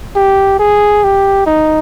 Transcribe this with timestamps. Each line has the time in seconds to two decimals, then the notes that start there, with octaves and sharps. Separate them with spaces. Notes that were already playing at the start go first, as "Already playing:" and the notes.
0.16 G4
0.60 G#4
1.04 G4
1.47 D#4